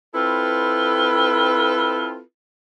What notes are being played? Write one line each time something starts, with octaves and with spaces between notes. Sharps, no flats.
C4 E4 F4 A4 B4